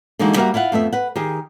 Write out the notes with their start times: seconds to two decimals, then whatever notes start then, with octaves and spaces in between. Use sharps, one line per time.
0.19 D3 E3 G#3 A#3 D#4 F#4
0.36 G3 A#3 F#4 A#4 E5 F#5
0.54 E4 F4 E5 F#5
0.72 F2 A3 B3 E5
0.93 B4 F#5
1.16 D#3 G4 G#4